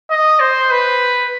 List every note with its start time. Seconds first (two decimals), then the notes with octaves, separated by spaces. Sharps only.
0.10 D#5
0.40 C5
0.70 B4